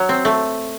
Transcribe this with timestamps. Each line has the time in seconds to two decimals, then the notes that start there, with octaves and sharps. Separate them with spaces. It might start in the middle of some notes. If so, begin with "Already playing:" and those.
Already playing: F#3
0.09 C4
0.25 A3